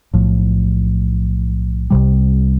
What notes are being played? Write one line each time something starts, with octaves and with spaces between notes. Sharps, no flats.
B1 A2 F3
C2 C3 G3